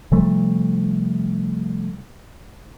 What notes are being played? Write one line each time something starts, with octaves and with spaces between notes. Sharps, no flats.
C3 F3 G3 A3